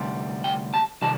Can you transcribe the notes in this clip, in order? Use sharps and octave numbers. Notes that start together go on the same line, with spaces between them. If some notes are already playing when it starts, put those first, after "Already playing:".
Already playing: D2 C3 G3
G5
A5
C3 D#3 G3 A5